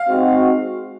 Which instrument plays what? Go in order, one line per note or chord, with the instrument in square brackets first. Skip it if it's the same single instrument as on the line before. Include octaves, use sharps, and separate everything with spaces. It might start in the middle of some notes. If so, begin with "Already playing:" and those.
Already playing: [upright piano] F5
[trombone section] G#3 C4 D#4 F#4